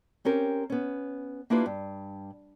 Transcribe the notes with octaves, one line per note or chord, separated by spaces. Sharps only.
C4 C#4 G4 A#4
B3 C#4
A#3 D4 E4 F4 G4 B4
G2